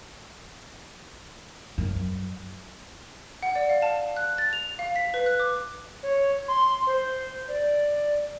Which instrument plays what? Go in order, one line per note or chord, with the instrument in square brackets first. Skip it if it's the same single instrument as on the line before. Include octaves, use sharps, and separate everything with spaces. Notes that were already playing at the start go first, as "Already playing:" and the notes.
[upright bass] F#2
[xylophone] F#5
D5
F5
A5
F#6
A6
F7
F5
B6
B4
F#6
D6
[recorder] C#5
C6
C5
D5